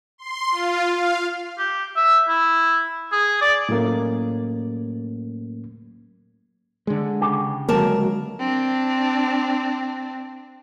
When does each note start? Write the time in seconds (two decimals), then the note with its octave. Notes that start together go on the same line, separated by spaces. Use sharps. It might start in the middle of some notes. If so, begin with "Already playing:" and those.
0.18 C6
0.51 F4
0.90 F5
1.59 G4
1.96 E5
2.29 E4
3.12 G#4
3.42 D5
3.69 A2 F#3 A3 A#3 C#4
6.87 D3 G#3
7.21 C#3 G4
7.69 C#2 D3 F#3 G#3 A#3 A#4 A5
8.40 C4 D4